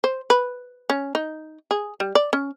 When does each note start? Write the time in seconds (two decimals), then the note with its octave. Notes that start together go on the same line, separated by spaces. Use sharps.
0.04 C5
0.30 B4
0.90 C#4
1.15 D#4
1.71 G#4
2.00 G3
2.15 D5
2.33 C#4